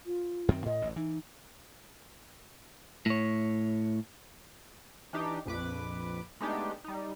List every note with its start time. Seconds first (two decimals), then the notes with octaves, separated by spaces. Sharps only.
0.06 F4
0.48 F#2 D#3 C4
0.66 A2 D#5
0.82 A1 D2
0.96 E3 D#4
3.06 A2 C#5
5.13 E3 D4 D#4 G4
5.45 A#1 F2 B4 D6
6.41 G#3 A3 B3 D4 D#4 G4
6.84 G3 D#4